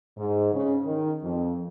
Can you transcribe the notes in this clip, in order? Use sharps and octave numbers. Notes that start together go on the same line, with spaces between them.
G#2
C#3
D#3
F2